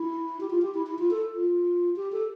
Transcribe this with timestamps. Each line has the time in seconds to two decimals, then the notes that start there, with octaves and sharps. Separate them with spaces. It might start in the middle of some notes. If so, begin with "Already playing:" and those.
Already playing: E4
0.41 G4
0.50 F4
0.62 G4
0.74 E4
0.86 E4
0.99 F4
1.11 A4
1.35 F4
1.96 G4
2.12 A4